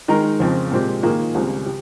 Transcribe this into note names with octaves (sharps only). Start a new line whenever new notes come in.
D#3 G#3 D#4 A#4
F2 C#3 F3 C4
A#2 G#3 C4 G4
D#3 A#3 F4 G#4
C#2 C#3 G3 C4
G4